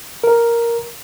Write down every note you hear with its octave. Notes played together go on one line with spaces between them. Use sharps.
A#4